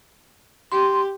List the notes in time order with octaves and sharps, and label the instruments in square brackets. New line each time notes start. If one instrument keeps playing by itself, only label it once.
[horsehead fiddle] G4 [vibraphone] C6